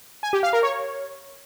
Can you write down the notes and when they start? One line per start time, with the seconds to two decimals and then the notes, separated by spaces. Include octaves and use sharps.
0.23 G#5
0.33 G4
0.43 F5
0.53 A#4
0.63 C#5